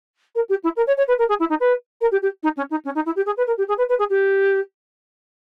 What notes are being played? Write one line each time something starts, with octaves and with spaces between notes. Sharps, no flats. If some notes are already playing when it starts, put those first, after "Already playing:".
A#4
G4
E4
A#4
C#5
C#5
B4
A#4
G#4
E4
D#4
B4
A#4
G4
G4
D#4
C#4
D#4
C#4
D#4
E4
G4
G#4
B4
A#4
G4
G#4
B4
B4
G#4
G4